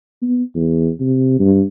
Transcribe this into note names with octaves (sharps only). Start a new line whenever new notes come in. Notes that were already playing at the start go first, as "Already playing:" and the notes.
B3
E2
C3
G2